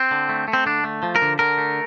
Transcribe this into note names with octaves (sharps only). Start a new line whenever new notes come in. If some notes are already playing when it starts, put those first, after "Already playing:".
Already playing: C4
D3
A3
A3
C4
D3 D4
A3
F3
A#4
D3
D3 A#4
A3